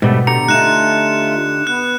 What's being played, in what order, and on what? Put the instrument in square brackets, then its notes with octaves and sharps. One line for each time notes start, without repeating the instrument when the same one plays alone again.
[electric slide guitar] G#2 G3 A3 [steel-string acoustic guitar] B2
[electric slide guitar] D3 G4 A#5 [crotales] C#7
[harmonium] A3 F4 [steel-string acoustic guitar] D#4 [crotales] F#6 E7
[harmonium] B3 [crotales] F#6